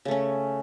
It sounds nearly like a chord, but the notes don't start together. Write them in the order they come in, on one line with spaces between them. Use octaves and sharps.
C#3 A3 C#4